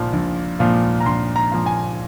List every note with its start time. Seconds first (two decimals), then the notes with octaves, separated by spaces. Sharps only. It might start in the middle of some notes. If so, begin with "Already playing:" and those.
Already playing: A#1 A#2 F3 A#3 F4
0.13 A#1
0.59 A#2 F3 A#3 F4
1.00 A#5
1.06 A#1 C6
1.36 A#5
1.51 A#2 F3 A#3 F4
1.66 G#5